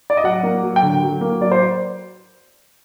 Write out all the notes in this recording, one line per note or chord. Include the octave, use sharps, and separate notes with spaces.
D5
D#5
F#3 F#5
A#3
F#3
G5
D3
F#3
A#3
F#3 D5
C5